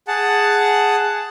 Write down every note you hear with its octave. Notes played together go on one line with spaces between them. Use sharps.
G#4 F#5 A5